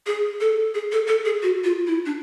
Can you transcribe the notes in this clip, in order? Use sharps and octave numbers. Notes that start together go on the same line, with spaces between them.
G#4
A4
G#4
A4
A4
G#4
F#4
F4
E4
D4